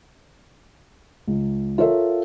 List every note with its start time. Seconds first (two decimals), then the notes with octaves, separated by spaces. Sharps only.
1.28 C#2
1.78 F4 A4 A#4 C#5 E5 F5